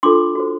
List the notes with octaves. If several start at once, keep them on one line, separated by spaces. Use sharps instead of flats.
D4 F4 A4 C6 D6
F#4 A4 C5